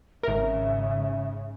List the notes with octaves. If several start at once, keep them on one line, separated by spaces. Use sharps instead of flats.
G#1 G#2 C#3 A#4 E5